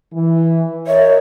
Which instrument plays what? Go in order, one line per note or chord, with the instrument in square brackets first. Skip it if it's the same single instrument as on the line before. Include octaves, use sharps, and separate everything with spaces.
[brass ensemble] E3
[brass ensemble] A#4 D#5 E5 [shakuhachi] C#5